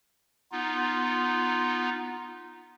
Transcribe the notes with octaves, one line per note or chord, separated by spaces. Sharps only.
B3 D#4 F4